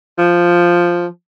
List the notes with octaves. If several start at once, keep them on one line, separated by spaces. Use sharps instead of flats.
F3